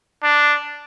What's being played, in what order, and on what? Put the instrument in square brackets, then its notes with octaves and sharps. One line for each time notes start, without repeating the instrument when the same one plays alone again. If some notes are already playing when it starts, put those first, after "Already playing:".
[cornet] D4